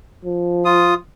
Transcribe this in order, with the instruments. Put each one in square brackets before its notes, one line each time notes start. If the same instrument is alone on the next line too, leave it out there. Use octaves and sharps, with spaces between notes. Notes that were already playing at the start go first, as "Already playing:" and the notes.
[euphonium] F3
[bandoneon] F4 D#6